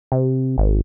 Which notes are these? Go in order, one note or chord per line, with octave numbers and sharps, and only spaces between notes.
C3
G#1